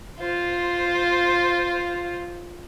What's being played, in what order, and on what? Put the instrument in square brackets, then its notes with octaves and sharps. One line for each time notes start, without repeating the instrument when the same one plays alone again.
[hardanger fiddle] F4 C5